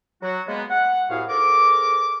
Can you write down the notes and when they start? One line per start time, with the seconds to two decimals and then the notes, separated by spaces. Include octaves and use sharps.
0.22 F#3 F#4
0.48 G#3 A#3 B3
0.70 F#5
1.10 C2 A2 F#4 G#4 F5
1.29 G#2 A4 A#4 D6